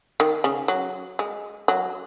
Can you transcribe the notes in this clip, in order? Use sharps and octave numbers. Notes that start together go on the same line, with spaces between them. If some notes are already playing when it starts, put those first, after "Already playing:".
D#3
C#3
F#3
G#3
F#3